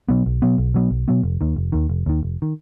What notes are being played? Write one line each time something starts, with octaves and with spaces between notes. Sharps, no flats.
B2 F#3 B3
B1
B2 F#3 B3
B1
B2 F#3 B3
B1
B2 F#3 B3
F1
D#2 D#3
F1
D#2 D#3
F1
D#2 D#3
F1
D#3